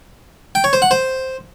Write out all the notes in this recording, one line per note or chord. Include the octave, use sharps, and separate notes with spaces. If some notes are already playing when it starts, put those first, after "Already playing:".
G5
C#5
C5
F#5
C5